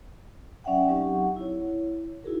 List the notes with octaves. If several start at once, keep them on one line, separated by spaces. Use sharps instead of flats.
F#3 C#4 D5 E5 F#5 G5
F#3 C4 D#4 G4 F#5 C#6
E4 C#5
D#4 E4 F#4 G#4 A#4